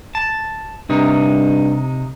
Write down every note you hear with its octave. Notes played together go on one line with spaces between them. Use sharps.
A5
G2 C3 D#4